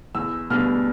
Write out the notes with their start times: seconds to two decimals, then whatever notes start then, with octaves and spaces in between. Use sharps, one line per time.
0.15 E2 E6
0.50 B2 G3 B3 D4 F6